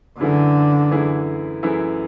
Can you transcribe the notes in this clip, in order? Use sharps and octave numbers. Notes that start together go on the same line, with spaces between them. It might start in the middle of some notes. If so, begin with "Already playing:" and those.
F#2 D3 E3 A3 E4 G#4
F#2 E3 A3 E4 G#4
F#2 E3 A3 E4 G#4